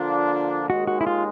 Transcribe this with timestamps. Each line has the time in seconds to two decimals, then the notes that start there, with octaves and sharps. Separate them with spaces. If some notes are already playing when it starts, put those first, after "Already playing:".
Already playing: D3 F3 A#3 D4 F4
0.70 D#2 D#3 G#3 F#4
0.87 F#4
1.01 E4
1.07 F4